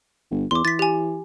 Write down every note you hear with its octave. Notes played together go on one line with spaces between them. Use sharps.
G1
E2 C6 D6
E3 A6 B6
G4 G#5